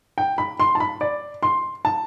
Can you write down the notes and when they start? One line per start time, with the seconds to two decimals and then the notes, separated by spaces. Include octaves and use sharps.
0.18 G5
0.38 B5
0.60 C6
0.75 A5
0.80 B5
1.01 D5
1.43 C6
1.85 A5